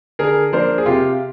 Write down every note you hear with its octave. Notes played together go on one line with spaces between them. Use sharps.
D3 G#4 A#4
F3 A#3 D4 A#4 C5
G#4
C3 F4 G4